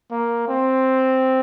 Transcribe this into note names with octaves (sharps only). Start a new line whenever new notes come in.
A#3
C4